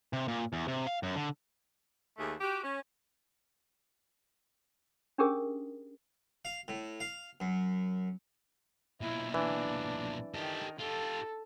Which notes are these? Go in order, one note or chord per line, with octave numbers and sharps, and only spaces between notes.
C3
A#2
E2
C3
F5
F#2
D3
D#2 A3 G#4
F#4 G4
C#4
C#4 D4 G4 G#4 A#4 D#6
F5
A2
F5
F#2
B1 A#2 E4
E3 D4
D#3 G4 A4
F4 G4 A4